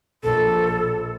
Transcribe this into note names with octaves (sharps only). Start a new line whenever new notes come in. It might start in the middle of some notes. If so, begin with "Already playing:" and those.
A#1 A4